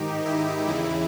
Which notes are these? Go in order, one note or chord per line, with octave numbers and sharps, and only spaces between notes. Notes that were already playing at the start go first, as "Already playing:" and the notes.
Already playing: G#2 D#3 D#4 G4
E4
E2 C#3 E3 E4